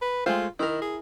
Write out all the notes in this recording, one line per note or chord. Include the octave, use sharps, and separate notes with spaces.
B4
G#3 A3 F4 C5
D#3 E4 A#4
G#4